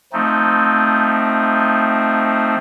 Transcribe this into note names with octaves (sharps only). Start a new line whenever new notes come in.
F3 A3 C4 D#4